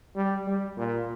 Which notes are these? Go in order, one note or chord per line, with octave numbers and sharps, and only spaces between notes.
G3
G3
A#2